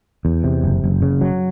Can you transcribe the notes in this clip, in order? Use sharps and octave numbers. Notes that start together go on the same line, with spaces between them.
E2
C3
F#1
F#1
C#3
F#3